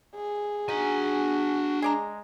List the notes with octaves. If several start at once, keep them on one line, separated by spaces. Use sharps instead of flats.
G#4
D4 D#4 F#4 G#5
G#3 G#4 D5 A#5